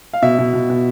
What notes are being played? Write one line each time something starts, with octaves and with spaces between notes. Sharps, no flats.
F5
B2 E5
B2
B2
B2